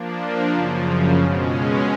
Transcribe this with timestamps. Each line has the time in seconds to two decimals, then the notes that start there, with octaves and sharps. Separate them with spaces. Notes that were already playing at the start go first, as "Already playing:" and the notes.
Already playing: F3 A#3 D4
0.51 F#2 C#3 F3
1.19 B2 G#3 C#4